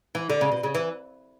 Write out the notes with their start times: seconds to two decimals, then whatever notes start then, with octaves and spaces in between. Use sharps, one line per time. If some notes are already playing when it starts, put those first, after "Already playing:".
0.15 E3
0.30 D3
0.41 C#3
0.52 B2
0.63 C#3
0.75 E3